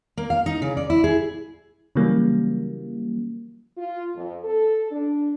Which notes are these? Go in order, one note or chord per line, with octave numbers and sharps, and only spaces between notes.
A#3
F5
D#4
C#3
D5
E4
G#4
C#3 E3 F#3 G3 A#3
F4
F2
A4
D4